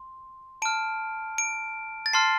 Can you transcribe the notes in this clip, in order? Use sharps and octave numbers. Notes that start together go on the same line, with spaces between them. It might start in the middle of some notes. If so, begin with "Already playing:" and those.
Already playing: C6
A5 F6 D7
D7
A6
A5 C6 F6 C7